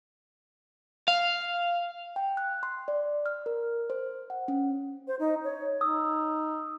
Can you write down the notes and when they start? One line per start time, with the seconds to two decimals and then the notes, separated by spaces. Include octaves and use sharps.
1.08 F5
2.16 G5
2.37 F#6
2.63 C6
2.88 D5
3.26 F6
3.46 A#4
3.90 C5
4.30 F#5
4.48 C#4
5.07 C5
5.19 D#4
5.44 C#5
5.81 D#4 D#6 E6